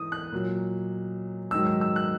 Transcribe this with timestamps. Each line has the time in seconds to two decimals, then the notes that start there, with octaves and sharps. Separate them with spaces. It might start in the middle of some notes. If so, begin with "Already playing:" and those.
Already playing: G#2 E3 D#6
0.12 F#6
0.32 A#2 F#3
1.51 G#2 D#3 F#3 E6
1.67 E6
1.81 E6
1.96 F#6